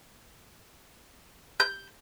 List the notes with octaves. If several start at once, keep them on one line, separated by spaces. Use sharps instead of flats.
G6